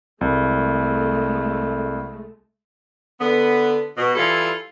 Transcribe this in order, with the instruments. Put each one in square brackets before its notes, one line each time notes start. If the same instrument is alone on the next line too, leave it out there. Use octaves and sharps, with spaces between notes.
[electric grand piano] C2 [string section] G#3 A3
[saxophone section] D3 B3
B2
E3 G3 E4 F4 A4